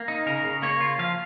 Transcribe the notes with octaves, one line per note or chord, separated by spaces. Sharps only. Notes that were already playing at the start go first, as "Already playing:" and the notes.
Already playing: A#3
D#4
C#3 A#4
C#3
A#3 C#5
F4
F3 F5